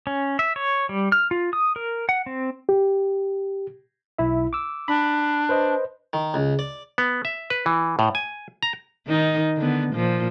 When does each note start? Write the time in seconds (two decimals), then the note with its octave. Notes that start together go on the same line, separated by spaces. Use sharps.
0.07 C#4
0.39 E5
0.56 C#5
0.89 G3
1.12 F6
1.31 F4
1.53 D#6
1.76 A#4
2.09 F#5
2.26 C4
2.69 G4
4.18 B1 E4 E5
4.53 D6 E6
4.88 D4 B5
5.49 B4 C5 D#5
6.13 D#3
6.34 C#2
6.59 D5
6.98 B3
7.25 E5
7.50 B4
7.66 E3
7.99 A2
8.15 G#5
8.63 A#5
9.07 D#3 D#4
9.57 D3 B3
9.95 A#2 F3